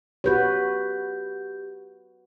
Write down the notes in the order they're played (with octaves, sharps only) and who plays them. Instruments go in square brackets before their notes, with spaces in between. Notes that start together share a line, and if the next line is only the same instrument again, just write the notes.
[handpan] F#4 B4 C#5 [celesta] G4 G6